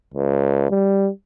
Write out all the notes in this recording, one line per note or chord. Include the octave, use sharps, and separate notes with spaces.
C#2
G3